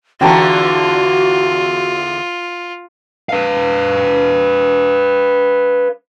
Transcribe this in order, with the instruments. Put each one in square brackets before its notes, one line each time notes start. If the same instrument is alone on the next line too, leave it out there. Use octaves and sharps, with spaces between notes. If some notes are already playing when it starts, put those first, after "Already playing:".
[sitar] E2 D3 E3 [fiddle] F4 [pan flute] F#4 [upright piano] G5 A5 A#5
[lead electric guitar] B4 F5